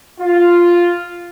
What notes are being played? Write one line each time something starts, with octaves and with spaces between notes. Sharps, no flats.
F4